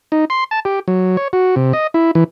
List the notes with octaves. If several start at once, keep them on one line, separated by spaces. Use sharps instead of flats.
D#4
C6
A5
G4
F#3
C#5
F#4
C3
D#5
E4
E3